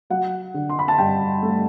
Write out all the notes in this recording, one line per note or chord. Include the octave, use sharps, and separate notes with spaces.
F#3 F#5
D3
C6
B5
A5
G2 G5
A3